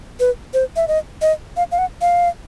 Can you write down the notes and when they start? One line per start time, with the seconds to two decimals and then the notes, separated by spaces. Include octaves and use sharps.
0.20 B4
0.54 C5
0.76 E5
0.88 D#5
1.22 D#5
1.57 F5
1.72 F5
1.78 F#5
2.01 F5